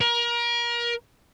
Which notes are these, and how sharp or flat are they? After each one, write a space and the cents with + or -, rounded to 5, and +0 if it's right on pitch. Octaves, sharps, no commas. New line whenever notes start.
A#4 +30